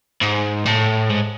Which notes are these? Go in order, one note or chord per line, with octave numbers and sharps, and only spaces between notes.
G#2
A2
G#2